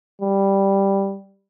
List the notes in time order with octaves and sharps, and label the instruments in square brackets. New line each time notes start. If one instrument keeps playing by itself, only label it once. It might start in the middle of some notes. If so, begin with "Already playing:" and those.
[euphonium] G3